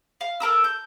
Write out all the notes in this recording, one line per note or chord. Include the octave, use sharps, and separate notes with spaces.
F5
A4 A#4 A#5 E6
G6